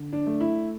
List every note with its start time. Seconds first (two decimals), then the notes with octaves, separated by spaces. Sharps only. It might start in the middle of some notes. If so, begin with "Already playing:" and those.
Already playing: D3
0.13 D4
0.26 A3
0.40 E4